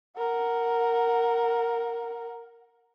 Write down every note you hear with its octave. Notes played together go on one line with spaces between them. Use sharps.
A#4 F#5